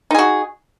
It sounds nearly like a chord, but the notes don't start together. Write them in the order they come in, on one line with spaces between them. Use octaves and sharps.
D#4 G#4 F#4